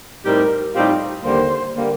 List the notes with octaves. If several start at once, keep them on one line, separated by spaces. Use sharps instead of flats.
A2 G3 C4 D#4 G4 A#4
A2 G3 C4 D#4 F4 G4
D#2 D3 G3 A#3 C5
D3 G3 A#3